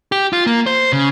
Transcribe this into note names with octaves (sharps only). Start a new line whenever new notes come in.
G4
F4
A#3
C5
C#3